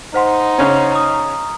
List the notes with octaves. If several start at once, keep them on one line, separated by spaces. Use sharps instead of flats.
D#4 C5 F#5 C6
C#3 C#4
A#5 D#6